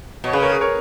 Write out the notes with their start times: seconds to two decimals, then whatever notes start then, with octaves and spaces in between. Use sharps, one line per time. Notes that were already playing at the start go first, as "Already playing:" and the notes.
0.24 B2 C#5
0.33 C#3 G#4 B4
0.42 A#4 C#5
0.52 G#4 B4
0.61 A#4 C#5